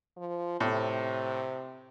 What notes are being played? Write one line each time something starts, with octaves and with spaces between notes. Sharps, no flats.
F3
A2 C3